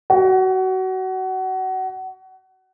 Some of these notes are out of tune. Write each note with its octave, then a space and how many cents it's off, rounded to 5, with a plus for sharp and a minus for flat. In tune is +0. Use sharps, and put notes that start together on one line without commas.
F#4 +25